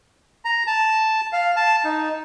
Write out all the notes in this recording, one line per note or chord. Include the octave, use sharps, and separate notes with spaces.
A#5
A5
F5
A5
D#4